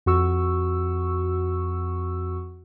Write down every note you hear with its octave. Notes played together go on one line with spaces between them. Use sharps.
F2 F#4 C#6 E6